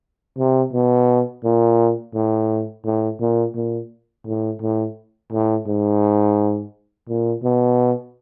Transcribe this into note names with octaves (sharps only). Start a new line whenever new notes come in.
C3
B2
A#2
A2
A2
A#2
A#2
A2
A2
A2
G#2
A#2
B2